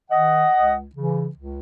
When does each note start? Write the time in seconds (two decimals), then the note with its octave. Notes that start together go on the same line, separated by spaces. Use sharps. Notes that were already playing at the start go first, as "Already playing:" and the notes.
0.10 D#3 D#5 F#5
0.52 C#2
0.94 C#3 E3
1.36 C#2